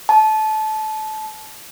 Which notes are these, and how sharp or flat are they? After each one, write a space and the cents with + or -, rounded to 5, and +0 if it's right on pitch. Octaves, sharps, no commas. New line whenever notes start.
A5 -20